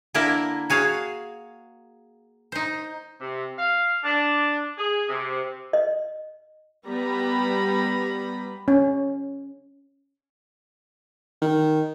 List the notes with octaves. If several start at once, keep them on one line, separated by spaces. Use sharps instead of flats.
D3 A#3 E4 A#4 E5
F#4 G#4 C#5 F5
D#4 C5
C3
F5
D4
G#4
C3
D#5
G3 B3 A#5 B5
C#4
D#3